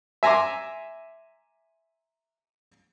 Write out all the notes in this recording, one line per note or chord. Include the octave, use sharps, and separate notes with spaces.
E5 G#5 A#5 C6 D6